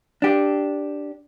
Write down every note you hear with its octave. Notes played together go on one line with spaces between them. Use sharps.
D4 G4